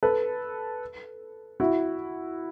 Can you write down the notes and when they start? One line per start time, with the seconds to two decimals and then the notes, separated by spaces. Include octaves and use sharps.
0.03 A4 B4
1.60 E4 F#4